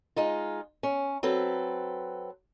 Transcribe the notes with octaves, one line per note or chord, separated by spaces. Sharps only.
G#3 D#4 F4
C#4
F#3 C4 A4 B4